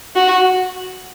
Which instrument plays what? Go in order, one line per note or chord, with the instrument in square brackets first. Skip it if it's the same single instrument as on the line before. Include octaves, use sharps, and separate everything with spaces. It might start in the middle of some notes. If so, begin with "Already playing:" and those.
[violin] F#4